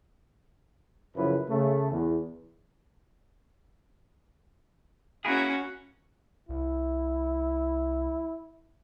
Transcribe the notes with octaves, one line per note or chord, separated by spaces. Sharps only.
F#2 C#3 F3 E4 B4
C#3 A3
E2
A#3 C#4 E4 F#4 G#4
C2 E4